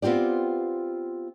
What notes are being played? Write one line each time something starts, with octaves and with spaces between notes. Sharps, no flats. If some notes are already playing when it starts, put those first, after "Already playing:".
B3 C4 F4 G4 D5